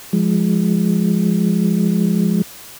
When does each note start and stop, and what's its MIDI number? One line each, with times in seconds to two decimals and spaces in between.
0.13 2.42 53
0.13 2.42 56